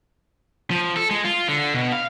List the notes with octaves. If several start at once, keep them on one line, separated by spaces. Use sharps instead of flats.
F3
A4
G#3
F4
D3
B2
F5